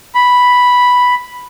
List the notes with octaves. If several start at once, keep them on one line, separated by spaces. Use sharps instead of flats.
B5